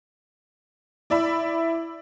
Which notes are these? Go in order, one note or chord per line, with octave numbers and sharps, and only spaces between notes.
E4 D5 E5 B5